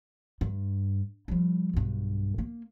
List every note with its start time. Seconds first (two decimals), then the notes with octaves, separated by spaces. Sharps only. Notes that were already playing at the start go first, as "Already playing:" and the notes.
0.41 G2
1.28 F3 G3
1.73 B1 G2
2.38 A#3